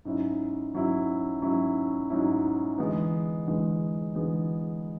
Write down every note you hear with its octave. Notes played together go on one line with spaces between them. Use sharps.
G#2 F#3 C#4 E4
G#2 F#3 C#4 E4
G#2 F#3 C#4 E4
G#2 F#3 C#4 E4
E2 D3 G#3 B3
E2 D3 G#3 B3
E2 D3 G#3 B3